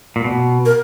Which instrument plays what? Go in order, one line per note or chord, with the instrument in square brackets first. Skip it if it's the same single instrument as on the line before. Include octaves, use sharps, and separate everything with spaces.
[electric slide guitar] A#2
B2
[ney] A#4